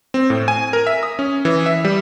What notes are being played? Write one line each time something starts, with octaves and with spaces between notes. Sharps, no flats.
C4
A2
G#5
A#4
E5
D#6
C#4
E3
E5
G3